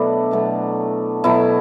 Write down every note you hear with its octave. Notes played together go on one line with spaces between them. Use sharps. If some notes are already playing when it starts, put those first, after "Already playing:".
Already playing: B2 F#3 A3 D4 E4
B2 F#3 A3
B2 F#3 A3 E4